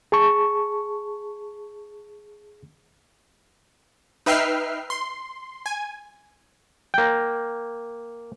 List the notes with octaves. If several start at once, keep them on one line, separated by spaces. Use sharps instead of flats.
G#4 A5 C#6
D#4 B4 E5 G5 F6 C7
C6
G#5
A#3 G5